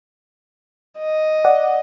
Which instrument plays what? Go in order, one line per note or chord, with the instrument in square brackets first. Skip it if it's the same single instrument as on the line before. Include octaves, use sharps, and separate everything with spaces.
[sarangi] D#5
[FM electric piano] D5 F#5